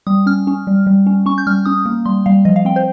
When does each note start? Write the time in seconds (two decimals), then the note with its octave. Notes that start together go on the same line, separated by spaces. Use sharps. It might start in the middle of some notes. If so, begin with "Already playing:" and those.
0.07 G3 D#6
0.26 C#4 F6
0.47 C#4
0.67 G3
0.87 G3
1.07 C#4
1.26 C#4 C#6
1.38 G6
1.47 G3 F6
1.65 C#4 D#6
1.86 A#3
2.06 G3 C6
2.26 G3 F5
2.45 F3 D#5
2.56 F5
2.65 C4 G5
2.76 C5